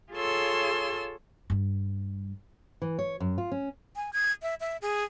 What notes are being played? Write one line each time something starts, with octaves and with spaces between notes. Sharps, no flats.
F4 G#4 A4 C#5 C6 E6
G2 G3
E3
C#5
F#2
F4
C#4
G#5
G#6
E5
E5
G#4